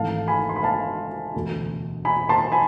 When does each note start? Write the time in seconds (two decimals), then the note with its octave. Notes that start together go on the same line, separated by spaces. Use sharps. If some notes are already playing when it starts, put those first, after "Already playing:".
Already playing: G#1 G#2 E3 A3 F5 A5
0.28 G#5 B5
0.49 C6
0.56 B5
0.63 F5 A5
1.34 E1 D2 D3
2.05 G#5 B5
2.29 A5 C6
2.52 G#5 B5